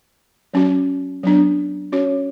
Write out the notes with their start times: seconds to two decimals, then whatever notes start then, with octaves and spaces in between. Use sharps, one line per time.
0.54 F#3 C#4 F#4
1.23 F#3 B3 D4
1.92 C#4 F#4 C#5